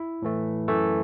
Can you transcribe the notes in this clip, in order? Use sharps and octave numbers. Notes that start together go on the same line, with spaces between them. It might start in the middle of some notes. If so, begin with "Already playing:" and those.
Already playing: E4
A2 E3 A3
F#2 E3 A3 A4